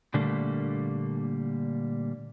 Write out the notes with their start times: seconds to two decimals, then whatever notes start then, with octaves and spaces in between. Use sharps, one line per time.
0.14 A#2 D3 G3 A3 A#3